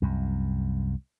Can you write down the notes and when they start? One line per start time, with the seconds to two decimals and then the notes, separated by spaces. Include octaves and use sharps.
0.02 C2 F#2